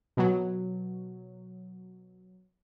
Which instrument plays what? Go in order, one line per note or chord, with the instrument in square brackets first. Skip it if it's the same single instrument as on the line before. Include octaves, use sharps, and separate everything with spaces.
[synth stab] B2 F#3